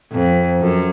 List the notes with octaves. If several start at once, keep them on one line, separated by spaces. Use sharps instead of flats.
F2
F#2